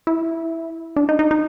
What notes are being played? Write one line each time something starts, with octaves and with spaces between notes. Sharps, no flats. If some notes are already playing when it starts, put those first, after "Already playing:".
E4
D4
D#4
D#4
D#4